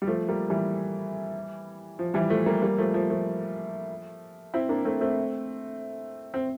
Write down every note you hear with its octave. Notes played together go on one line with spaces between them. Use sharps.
G3
F3 A3
G3 A#3
E3 G3
F3
E3 G3
F3 A3
G3 A#3
G3 A#3
F3 A3
F3
F3 A3
C4 E4
A#3 D4
A3 C4
A3 C4
C4